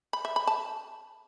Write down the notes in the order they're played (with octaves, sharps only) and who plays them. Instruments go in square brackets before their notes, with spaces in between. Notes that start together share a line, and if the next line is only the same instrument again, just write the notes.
[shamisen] B5
E5
B5
A5